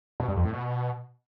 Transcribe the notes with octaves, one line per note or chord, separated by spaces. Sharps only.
B2
G2
F2
A2
B2